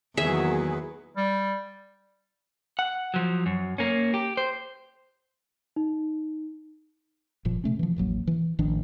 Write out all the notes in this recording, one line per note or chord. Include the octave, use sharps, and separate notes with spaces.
E2 D#3 F#3 A#3 F#4 G#4 B4 E5
G3
F#5
F3 F#3
F#2
A#3 C#4
G4
C5
D#4
F#1 A#2 F3
C3 A3 C#4
E3 F3
E1 A1 F#3 A#3
E3
A1 D#3 F3 D4